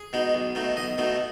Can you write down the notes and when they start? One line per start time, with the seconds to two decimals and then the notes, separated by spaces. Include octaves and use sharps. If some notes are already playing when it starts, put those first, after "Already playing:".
Already playing: G#4
0.13 B2 G#3 D#4
0.35 B1
0.55 B2 A3 D#4
0.76 B1 D#5
0.98 B2 A3 D#4